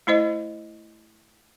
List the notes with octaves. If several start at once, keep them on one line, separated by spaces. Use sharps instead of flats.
A3 E4 C5 D#5